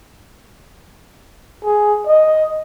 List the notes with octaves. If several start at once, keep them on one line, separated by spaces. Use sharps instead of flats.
G#4
D#5